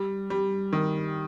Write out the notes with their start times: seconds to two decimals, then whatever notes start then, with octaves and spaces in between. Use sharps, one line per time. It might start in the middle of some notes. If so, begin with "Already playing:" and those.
Already playing: G3
0.30 G3
0.73 D#3